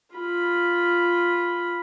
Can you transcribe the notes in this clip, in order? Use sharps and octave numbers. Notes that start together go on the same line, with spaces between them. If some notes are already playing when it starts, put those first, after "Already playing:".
F4 B5